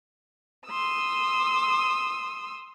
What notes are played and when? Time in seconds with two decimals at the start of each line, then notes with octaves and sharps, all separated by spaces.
0.68 C6 D#6 E6